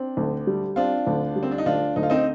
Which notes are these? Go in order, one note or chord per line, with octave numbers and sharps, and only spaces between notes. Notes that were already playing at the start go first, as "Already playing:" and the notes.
Already playing: C4 D4
D2
G3
C4 D4 F4
D2
G3
C4
D4
D#4
D2 D4 F4
D2 D#4
F4
C4 D#4